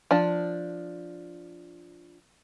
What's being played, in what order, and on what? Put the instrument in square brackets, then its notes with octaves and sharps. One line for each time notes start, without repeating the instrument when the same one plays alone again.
[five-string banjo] F3 D4 A5